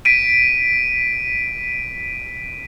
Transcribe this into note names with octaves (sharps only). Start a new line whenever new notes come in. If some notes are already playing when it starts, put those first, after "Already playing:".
B6 D7 D#7